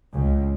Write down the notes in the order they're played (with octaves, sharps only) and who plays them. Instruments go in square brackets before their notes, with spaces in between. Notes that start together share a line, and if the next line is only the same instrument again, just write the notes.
[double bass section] C#2